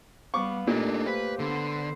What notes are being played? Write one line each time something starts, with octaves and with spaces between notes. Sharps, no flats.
G3 B3 F5 C#6 D6
A#2 A3 D4 D#4 G4 A4 A#4
G4 B4 C5 F5
D3 B3 A4 C5